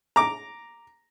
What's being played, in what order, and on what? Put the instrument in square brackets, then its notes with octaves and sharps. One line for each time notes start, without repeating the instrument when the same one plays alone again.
[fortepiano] A#5 D6